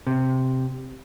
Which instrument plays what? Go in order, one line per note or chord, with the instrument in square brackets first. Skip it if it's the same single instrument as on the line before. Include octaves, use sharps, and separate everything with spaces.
[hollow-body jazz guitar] C3